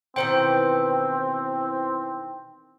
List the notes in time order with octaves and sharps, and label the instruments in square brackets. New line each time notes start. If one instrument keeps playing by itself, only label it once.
[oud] B2 D#3 E3 [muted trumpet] C4 [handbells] C5 G5